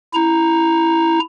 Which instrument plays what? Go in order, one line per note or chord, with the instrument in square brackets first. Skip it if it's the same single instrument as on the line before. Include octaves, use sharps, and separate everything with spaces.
[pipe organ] E4 A#5